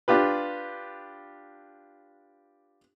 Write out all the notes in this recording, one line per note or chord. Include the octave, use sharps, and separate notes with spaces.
D4 F4 G4 B4